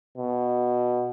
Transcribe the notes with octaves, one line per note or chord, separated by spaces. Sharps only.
B2